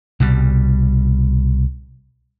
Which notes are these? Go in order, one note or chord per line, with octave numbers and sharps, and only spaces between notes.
C2 B2 G3